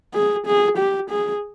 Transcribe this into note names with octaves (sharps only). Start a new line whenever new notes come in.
G#4
G#4
G4
G#4